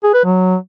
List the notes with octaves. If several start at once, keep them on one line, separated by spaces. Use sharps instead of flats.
G#4
B4
F#3